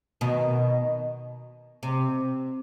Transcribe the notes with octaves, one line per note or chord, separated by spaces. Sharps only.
B2 D#3
C3